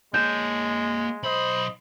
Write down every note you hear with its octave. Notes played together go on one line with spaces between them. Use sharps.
G#3 A#3 C#5 G6 E7
B1 C5 D#5 B5